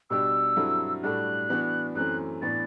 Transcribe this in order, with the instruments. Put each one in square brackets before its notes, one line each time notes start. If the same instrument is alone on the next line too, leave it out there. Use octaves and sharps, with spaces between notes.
[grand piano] B2 G3 D4 G4 [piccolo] E6
[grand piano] G2 F#3 C4 E4 A4
[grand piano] A2 G3 D4 F#4 A4 [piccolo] F#6
[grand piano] E3 B3 D4 F#4
[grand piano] F#2 E3 A3 C4 [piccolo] F#6
[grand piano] A2 E3 B3 D4 [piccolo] A6